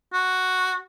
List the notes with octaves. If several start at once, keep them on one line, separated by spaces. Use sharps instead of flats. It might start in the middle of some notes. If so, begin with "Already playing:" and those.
F#4